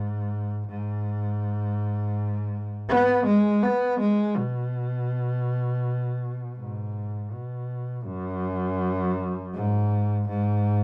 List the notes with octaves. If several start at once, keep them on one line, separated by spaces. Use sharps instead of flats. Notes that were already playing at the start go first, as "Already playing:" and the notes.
Already playing: G#2
G#2
B3
G#3
B3
G#3
B2
G#2
B2
F#2
G#2
G#2